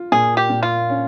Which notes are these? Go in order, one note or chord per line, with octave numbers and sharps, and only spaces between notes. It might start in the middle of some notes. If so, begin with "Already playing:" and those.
Already playing: F4
A#2 G#4
G4
A#2
F4
C#4